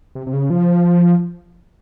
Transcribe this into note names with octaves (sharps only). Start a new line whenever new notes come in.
C3
C3
C#3
F3